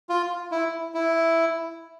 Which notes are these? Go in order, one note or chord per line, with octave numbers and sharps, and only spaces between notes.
F4
E4
E4